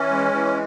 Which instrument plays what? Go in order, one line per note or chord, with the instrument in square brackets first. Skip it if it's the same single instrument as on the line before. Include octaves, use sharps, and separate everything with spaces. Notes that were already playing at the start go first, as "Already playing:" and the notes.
Already playing: [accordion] E3 C#4
G#3
E3